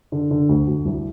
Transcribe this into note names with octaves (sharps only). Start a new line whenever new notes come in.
D3
D3
D2
D2
C2